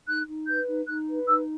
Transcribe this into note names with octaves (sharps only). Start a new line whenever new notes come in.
D#4 F#6
D#4
B4 G6
D#4
D#4 F#6
B4
D#4 E6